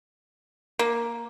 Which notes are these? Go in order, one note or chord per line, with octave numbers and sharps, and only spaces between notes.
A#3